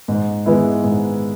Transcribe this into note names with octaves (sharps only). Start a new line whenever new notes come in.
G#2
E3 G#3 B3 E4
G#2